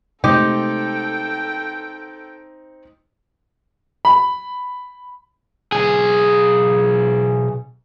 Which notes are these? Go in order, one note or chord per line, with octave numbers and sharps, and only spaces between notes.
C3 G#3 A3 C4 D#4 G4 A4 G5
B5
B1 G#4